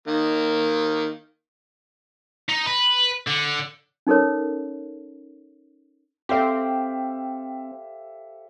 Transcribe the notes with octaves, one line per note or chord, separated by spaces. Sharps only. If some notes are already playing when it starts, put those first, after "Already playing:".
D#3 A#3
D#4
B4
D3
C#4 D#4 A4 A#4 C#5
C4 G4 A4 C5 E5 F5